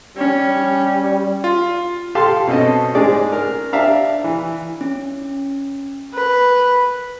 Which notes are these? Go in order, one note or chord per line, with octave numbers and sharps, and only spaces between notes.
G3 C#4
F4
G4 A4 F5 A5 C6
B2 C4 C#4 A4 D#5
G#2 G#3 C#4 G#4 D5
A#4
D4 G4 E5 F5 A#5
E3
C#4
B4